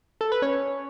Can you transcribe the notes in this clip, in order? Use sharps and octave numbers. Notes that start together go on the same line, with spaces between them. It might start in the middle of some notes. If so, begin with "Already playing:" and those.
A4
B4
C#4 C#5